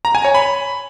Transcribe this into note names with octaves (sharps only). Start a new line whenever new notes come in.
A#5
G#5
C#5
B5